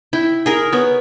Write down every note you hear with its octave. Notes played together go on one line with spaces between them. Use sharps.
E4 G5
G#4 A#4
B3 C#5